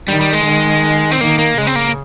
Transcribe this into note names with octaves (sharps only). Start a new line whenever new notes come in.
D#3 G3
G3
G#3
D#3
C4
D#3 A#3
A#3
C#3 G#3
C4
A#3